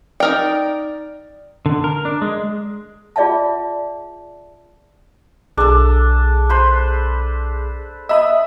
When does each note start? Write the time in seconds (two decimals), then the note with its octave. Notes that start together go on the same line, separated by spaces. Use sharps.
0.20 D#4 A#4 D5 G5
1.66 D3
1.84 A#4
2.05 D4
2.22 G#3
3.16 F4 G#4 D5 E5 F#5 A5
5.57 B1 D4 G#4 A4
6.49 B4 C5 B5
8.09 D#5 E5 B5 D#6